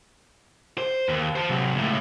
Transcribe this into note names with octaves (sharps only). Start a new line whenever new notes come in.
C5
D#2
C5 A5
C3 F#3
C#2 A2